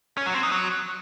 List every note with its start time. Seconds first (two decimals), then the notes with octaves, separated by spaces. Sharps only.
0.17 C#4
0.26 F#3
0.34 C4
0.43 D#4
0.51 F#3